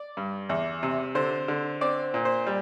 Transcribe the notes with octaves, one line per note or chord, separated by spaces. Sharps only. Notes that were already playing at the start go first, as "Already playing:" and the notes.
Already playing: D5
G2
E2
C3
D3 C5
D3
C4 D5
A#2
C5
G3